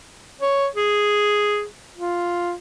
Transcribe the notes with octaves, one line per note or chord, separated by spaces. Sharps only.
C#5
G#4
F4